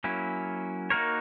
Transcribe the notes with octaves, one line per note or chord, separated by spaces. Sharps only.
F#3 A#3 C#4 E4
A#3 D#4 F#4 A#4 C#5